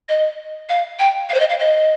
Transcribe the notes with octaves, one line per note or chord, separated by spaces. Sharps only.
D#5
F5
G5
F5
C5
D#5
F5
D#5